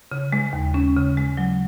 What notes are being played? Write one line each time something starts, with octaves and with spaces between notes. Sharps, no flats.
C#3
G#3
D#2
C#4
C#3
G#3
F#3